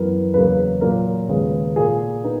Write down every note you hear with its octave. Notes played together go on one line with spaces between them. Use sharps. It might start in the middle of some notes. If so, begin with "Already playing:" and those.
Already playing: F#2 E3 B3 A#4
E2 C#3 F#3 A#3 B4
A#2 F#3 A#3 A#4
D#2 C#3 G#3 B3
A#2 A#3 G#4
B3 D#4